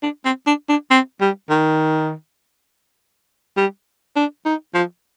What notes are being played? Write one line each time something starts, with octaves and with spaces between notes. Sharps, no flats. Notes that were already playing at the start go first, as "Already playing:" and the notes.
D4
C4
D4
D4
C4
G3
D#3
G3
D4
D#4
F3